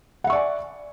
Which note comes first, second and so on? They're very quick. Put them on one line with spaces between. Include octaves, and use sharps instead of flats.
F#5 E5 C#6 D5 G#5